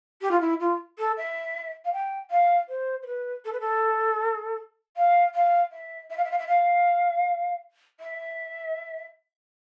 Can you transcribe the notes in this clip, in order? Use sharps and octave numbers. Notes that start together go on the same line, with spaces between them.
G4
F4
E4
F4
A4
E5
F5
G5
F5
C5
C5
B4
A4
B4
A4
F5
F5
E5
E5
F5
E5
F5
E5
F5
E5